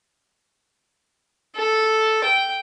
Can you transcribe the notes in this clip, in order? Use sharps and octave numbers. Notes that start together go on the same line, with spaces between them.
A4
G5